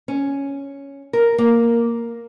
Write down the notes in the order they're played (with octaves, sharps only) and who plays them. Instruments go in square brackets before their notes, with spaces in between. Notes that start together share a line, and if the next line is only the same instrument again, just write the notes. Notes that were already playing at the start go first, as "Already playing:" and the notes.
[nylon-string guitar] C#4
A#4
A#3